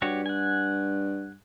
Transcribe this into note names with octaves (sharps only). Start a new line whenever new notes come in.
G2 F#4 G4 C#5
F#5 G#5